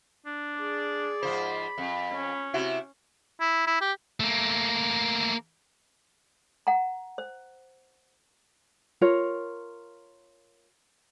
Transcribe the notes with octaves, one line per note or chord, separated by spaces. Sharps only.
D4
G#4 D5
G#2 F3 C5 B5
F2
C#4
C3 E4 F#4
E4
E4
G4
A3 A#3
F#5 A#5
C5
F4 A#4 C#5